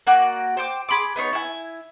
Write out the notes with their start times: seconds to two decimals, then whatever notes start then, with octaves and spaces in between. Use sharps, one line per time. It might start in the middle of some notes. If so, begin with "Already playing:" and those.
0.07 A#3 F#4 D5
0.57 C5 G5 D6
0.89 G#4 B5 C6 D6
1.16 B3 D#4 C5 C#5
1.33 E4 G#5